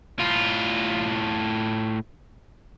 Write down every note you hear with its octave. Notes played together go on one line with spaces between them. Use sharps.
A2 F4